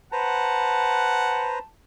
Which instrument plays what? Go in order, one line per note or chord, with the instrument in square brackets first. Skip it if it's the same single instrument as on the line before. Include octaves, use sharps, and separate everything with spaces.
[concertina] B4 C5 A#5 [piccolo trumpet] F#5 [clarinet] A5